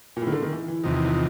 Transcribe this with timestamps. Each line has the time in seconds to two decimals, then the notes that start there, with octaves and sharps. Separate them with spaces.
0.17 A#2
0.22 A2
0.27 D#3
0.32 D3
0.42 D#3
0.52 E3
0.68 E3
0.83 E2 C3 D#3 F3
0.95 E3
1.06 F3